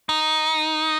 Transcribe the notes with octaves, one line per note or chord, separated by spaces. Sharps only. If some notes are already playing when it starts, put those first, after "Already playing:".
D#4